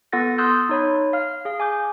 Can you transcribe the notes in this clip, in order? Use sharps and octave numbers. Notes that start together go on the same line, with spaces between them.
B3 F4 A4 F#5 A6 A#6
C6 D#6 E6 F#6 G6 A6
D#4 C#5 B5
F5 F6
G#4 F5
G#5 D6 G6